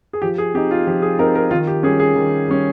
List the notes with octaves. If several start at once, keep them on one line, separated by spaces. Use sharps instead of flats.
G#4
F3 G4
G#4
C4 D#4 G4
F4
F3 G4
G#4
C4 D#4 A#4
A#4
D#3 F4
G4
G3 C#4 G#4
G#4
D#3
G3 C#4